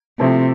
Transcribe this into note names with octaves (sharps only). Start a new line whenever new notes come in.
C3 F3 A3 C4 E4 A4